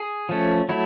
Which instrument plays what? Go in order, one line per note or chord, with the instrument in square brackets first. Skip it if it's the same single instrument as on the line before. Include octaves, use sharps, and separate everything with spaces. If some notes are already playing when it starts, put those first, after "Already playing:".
Already playing: [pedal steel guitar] G#4
F3 A3 C#4
F#3 A3 E4